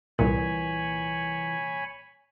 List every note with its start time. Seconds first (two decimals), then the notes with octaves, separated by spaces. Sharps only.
0.19 C2 A#2 E3 C#5 G#5 B5